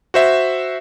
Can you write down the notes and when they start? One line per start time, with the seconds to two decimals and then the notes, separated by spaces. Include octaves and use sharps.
0.14 F#4 C5 E5